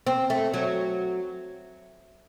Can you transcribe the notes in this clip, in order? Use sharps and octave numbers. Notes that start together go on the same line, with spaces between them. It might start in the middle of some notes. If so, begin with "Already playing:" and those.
C4
A3
F#3